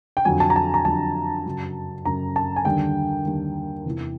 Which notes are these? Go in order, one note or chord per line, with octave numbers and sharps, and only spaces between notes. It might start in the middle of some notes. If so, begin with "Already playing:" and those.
G5
F2 D3 F#3 G#5
A5
A#5
A5
A#5
F2 D3 F#3 A5
F#2 C#3 F#3
F#2 C#3 F#3 A#5
A5
G#5
D#2 D3 G3 G5
D#2 D3 G3
E2 C3 E3